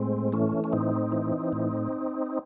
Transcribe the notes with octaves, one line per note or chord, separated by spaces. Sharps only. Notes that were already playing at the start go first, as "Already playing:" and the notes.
Already playing: A2 G#3 C4
E3 A3 C#4
C#4
A2 C4 D#4
E3
A2